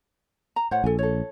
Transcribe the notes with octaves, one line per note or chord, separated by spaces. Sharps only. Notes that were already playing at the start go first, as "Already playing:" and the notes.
A#5
A2 C5 C#5 F#5
A#1 A4 G#5
A4 C#5